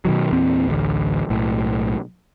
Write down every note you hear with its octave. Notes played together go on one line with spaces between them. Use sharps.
B2 D#3 F#3
E2 A#2 E3 C4
A1 D2
B1 A2